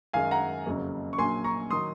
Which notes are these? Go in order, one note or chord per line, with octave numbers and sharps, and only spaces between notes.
F#2 D#3 G#3 F5 G#5
F#5 A#5
F#1 F2 C#3 F#3 A#3
C#6
A#1 A#2 F#3 A#3 G#5 C6
A#5 C#6
D#3 F#3 C6 D#6